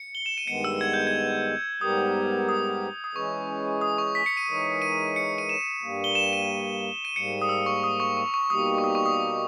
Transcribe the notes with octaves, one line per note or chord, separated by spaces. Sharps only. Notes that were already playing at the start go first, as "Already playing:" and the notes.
Already playing: C#7
G7
E7
D#7
G2 D#3 G#3 B3 C#7
E6
G#6
G6
G#6
G#2 G3 B3 G4 A#4 D#6
D#6
D#6
E3 G#3 C#4 G#4 B4 C#6
D#6
C#6
B6
C#7
D#7
E3 G#3 D#4 A#4 C#5
D#7
C#7
D#7
E7
G2 G3 A#3
G7
E7
D#7
D#7
G#2 G3 A#3 C#7
D#6
E6
C#6
D#6
C#6
C#6
C#6
B2 G3 A#3 D#4 G4 D#6
C#6
D#6
C#6
D#6